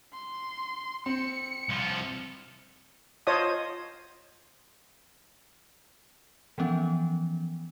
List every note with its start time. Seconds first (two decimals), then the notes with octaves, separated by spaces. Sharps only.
0.13 C6
1.06 C4 C#7
1.69 C2 F3
3.27 F4 C5 C#5 D#5 A5 D#6
6.58 E3 F3 B3 C#4